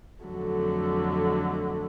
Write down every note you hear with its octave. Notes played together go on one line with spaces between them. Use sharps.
F2 D3 F#3 A3